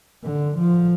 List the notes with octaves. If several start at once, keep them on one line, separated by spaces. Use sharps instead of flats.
D3
F3